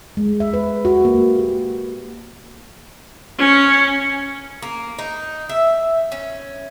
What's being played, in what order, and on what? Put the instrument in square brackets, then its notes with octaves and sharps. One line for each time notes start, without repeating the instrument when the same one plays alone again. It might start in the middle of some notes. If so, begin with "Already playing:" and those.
[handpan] G#3
E5
B4
F#4
A#3
G4
[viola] C#4
[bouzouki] A#3
D#4
E5
C#4